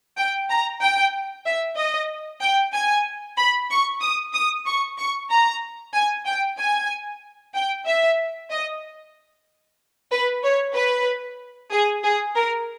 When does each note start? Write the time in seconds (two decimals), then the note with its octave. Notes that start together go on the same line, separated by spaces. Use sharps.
0.17 G5
0.49 A#5
0.81 G5
1.46 E5
1.77 D#5
2.41 G5
2.74 G#5
3.38 B5
3.70 C#6
4.01 D#6
4.34 D#6
4.66 C#6
4.98 C#6
5.31 A#5
5.94 G#5
6.26 G5
6.58 G#5
7.55 G5
7.86 E5
8.51 D#5
10.11 B4
10.43 C#5
10.75 B4
11.72 G#4
12.03 G#4
12.36 A#4